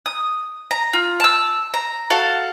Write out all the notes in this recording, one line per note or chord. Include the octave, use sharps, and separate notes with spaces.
D#6
A#5
F4
A5 E6
A#5
F#4 A4 F5